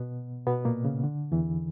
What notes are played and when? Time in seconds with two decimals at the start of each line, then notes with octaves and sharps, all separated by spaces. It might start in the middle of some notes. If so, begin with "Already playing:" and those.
Already playing: B2 B3
0.47 B2 B3
0.65 A#2 A#3
0.85 C#3
1.04 D3
1.32 E2 E3